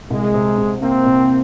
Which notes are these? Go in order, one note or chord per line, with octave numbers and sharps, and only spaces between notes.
C2 G#3
C3
C3
A#3 C4
C3